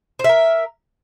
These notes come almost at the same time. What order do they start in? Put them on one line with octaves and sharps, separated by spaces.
C5 E5 A#4